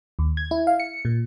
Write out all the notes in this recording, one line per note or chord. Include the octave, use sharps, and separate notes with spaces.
D#2
G#6
E4
F5
C#7
A#2